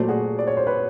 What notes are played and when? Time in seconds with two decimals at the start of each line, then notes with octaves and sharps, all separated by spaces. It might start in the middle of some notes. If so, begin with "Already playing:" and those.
Already playing: A#2 F#3 A3 C5 D5
0.09 F#4 G#4
0.39 D5
0.47 C#5
0.57 C5
0.67 B4 C#5